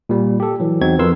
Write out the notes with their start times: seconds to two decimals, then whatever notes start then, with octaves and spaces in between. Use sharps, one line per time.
0.09 A#2 G3
0.40 G4 A4
0.60 E3 F#3
0.81 E2 C4 D#4 F#4 G#6
0.99 F2 A#4 B4 C6 E6